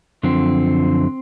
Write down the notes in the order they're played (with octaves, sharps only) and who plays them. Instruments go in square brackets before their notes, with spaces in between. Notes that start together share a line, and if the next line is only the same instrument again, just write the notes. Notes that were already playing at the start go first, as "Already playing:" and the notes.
[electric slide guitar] F#2 D3 F3 C4